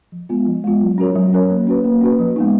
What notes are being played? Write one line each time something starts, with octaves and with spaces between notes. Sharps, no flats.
F3
G#3 B3 F4
F3
G#3 B3 F4
F#3
C#4 F#4 A#4 C#5
F#3
C#4 F#4 A#4 C#5
A#3
C#4 F#4 B4
A#3
C#4 F#4 B4
F3
G#3 B3 D#4